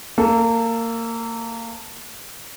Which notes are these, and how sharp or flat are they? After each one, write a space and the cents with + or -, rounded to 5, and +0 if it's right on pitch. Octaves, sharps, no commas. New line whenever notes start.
A#3 -25 A4 +0